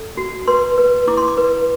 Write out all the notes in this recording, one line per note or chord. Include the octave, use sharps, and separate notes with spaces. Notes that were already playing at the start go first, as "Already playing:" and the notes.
Already playing: A4
F#4
B4 C6
B4
E4 D6
C6
D6
B4